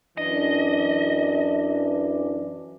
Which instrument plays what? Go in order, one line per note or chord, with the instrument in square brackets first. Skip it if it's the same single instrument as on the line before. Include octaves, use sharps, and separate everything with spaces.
[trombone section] F#2 E3 D4 [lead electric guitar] D#5